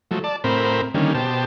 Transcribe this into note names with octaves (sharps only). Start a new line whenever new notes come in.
F3 F#3 A3
D5 A5
A2 C4 A#4 C5 B5
D3 D#3 G3 A#3 C#4
B2 G4 C5 A5